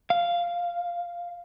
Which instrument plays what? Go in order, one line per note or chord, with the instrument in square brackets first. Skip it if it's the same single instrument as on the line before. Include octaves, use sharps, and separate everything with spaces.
[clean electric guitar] F5